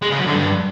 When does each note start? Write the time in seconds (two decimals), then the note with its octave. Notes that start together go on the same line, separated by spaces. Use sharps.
0.02 G#3
0.10 C#3
0.18 F#3
0.27 D3
0.35 G2